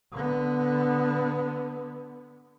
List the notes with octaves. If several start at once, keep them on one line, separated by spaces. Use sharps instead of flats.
D3 B3